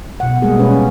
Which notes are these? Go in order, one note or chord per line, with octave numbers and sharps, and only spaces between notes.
B2 F#5
G3 G#3 A#3 G#4
B2 C#4 B4